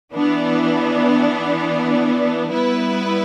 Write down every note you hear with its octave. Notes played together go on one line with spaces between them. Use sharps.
E3 B3 D4
G3 B3 E4 B4